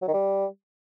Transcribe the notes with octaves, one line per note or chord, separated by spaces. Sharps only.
F#3
D#3
G3